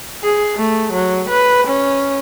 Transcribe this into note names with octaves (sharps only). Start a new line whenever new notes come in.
G#4
A3
F#3
B4
C#4